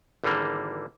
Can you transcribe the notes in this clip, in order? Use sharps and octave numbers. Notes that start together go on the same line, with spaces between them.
G#1 D3 E3 G3 A#3